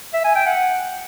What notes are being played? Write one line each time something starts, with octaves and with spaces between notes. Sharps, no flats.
E5
G#5
G5
F#5